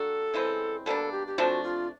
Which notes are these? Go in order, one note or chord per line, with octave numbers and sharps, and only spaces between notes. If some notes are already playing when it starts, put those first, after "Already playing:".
Already playing: G3 A#3 D4 F#4 A4
C#3 E3 G#3 C4
B2 G3 A#3 D4 A4
G4
G4
C3 F3 A3 D4 F#4
F4